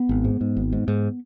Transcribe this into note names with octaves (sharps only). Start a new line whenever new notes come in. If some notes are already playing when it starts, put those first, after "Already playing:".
Already playing: B3
G#1
G#2
G#2
G#1
G#2
G#2